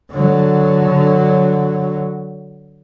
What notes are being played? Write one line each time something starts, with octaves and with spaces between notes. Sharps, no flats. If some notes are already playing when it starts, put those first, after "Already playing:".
D3 F#3